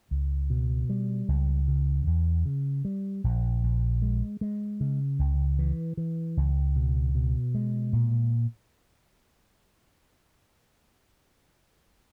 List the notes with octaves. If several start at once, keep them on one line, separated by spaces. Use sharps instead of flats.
C#2
B2
G3
C#2
C#3
E2
C#3
G3
A#1
A#1
G#3
G#3
C#3
C#2
E3
E3
C#2
B2
B2
G#3
A#2